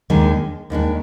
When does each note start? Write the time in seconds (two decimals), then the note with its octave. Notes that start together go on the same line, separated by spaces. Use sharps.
0.10 D#2 D#3 G#3 D4
0.70 D#2 D#3 G#3 D4